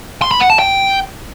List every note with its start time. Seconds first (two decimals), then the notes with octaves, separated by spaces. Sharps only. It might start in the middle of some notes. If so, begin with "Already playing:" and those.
0.22 C6
0.31 B5
0.40 F#5
0.50 A5
0.59 G5